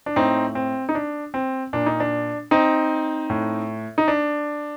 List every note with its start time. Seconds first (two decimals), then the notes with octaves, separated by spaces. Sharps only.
0.06 D4
0.16 A2 C4 D#4
0.55 C4
0.89 D#4
0.95 D4
1.34 C4
1.73 A#2 D4
1.86 D#4
2.00 D4
2.51 C4 D#4
3.30 A2
3.98 D#4
4.08 D4